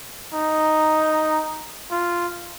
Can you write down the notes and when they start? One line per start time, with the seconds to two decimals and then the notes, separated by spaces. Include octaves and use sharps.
0.33 D#4
1.91 F4